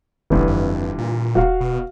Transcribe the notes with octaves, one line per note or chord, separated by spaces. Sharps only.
E1 A1 G2 D3 E3
F2
A#2
D#1 F#4 F5
B2